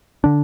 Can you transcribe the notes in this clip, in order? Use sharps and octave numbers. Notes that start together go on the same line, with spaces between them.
D3 D4